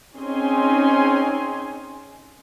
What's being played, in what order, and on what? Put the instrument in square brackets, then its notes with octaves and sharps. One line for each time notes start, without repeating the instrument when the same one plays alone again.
[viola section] C4 C#4 D#4 G#4 G#5 C6